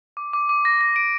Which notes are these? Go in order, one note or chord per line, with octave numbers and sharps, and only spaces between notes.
D6
D6
D6
A#6
A#6
D7